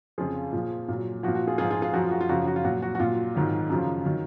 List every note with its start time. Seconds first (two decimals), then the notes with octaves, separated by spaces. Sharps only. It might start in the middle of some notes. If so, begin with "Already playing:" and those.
0.18 F2 C#3 F3 F4 G#4
0.53 A#2 F3
0.88 A#2 F#3
1.23 F3 F#4
1.28 A#2
1.35 F#4
1.47 F4 G#4
1.58 G#2 F3 F4 G#4
1.70 F4 G#4
1.82 F4 G#4
1.93 F#2 F3 F#4
2.03 F4
2.11 F#4
2.21 F4
2.29 F#2 C#3 F3 F#4
2.47 F#4
2.56 F4
2.64 A#2 F#3 F#4
2.82 F#4
2.95 F#4
3.00 A#2 F#3 F4
3.35 G#2 D#3 F#3
3.69 F#2 C#3 F3
4.05 D#3 F#3